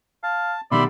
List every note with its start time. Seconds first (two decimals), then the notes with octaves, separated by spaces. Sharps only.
0.23 F5 A5
0.72 B2 D#3 G3 D5 E5 B5 C6